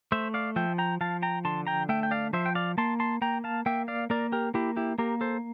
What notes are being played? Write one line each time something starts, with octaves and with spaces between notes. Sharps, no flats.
A3 C5 E5
D5 F5
F3 E5 G5
G5 A#5
F3 F5 A5
G5 A#5
D3 A5 C6
G5 A#5
A3 E5 G5
G5
D5 F5
F3 C5 E5
G5
D5 F5
A#3 A5 C6
A5 C6
A#3 G5 A#5
F5 A5
A#3 E5 G5
D5 F5
A#3 A#4 D5
G4 A#4
A#3 E4 G4
E4 G4
A#3 G4 A#4
A4 C5